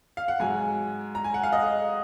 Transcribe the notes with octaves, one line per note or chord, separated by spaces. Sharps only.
F5
F#5
G#2 F#3 G#5
A#5
G#5
F#5
F5
D#5